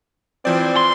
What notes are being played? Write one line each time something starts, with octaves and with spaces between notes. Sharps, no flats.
E3 F3 C4 D5
C6